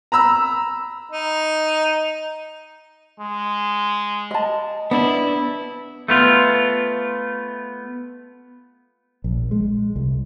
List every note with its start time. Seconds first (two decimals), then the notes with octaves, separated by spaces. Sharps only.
0.12 A#5 B5 E6
1.12 D#4
3.19 G#3
4.31 D#5 A5
4.91 B3 D4 E4
6.08 A3 B3 F4
9.24 A#1
9.51 G#3
9.96 C2